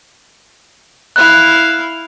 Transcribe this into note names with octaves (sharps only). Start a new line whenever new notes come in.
E4 F5 F#6